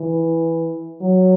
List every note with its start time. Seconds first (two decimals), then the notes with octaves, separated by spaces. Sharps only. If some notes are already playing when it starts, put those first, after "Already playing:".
Already playing: E3
1.01 F#3